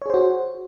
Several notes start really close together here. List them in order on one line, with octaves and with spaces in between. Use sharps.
C#5 G#4 C5 F#4